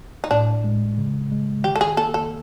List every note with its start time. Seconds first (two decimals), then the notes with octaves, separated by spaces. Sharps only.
0.24 D#4
0.31 A2 D4
0.64 G#3
0.98 C#3
1.31 G#3
1.64 D#3 G4
1.76 A4
1.81 G#4
1.97 A#3 A4
2.14 A4